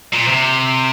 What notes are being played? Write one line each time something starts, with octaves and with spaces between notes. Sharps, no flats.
A#2
C3